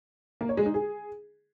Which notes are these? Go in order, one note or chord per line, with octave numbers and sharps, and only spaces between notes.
A#3
C#5
G#3
D#4
G#4